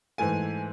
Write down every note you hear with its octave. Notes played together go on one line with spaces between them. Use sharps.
G#2 E3 A3 G#5